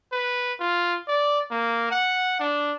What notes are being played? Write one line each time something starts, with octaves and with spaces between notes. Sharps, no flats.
B4
F4
D5
A#3
F#5
D4